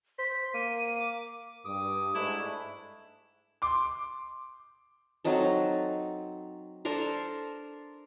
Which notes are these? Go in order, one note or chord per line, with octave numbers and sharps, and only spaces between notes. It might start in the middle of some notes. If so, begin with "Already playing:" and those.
C5 B6
A#3 D#7
D6
G2 D6 D#6
G#2 A3 D4 E4
C6 D6
F#3 C4 D#4 A4
D4 A4 A#4 C5